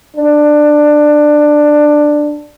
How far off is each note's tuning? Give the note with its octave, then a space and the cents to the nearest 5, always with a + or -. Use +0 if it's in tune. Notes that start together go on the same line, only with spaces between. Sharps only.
D4 +15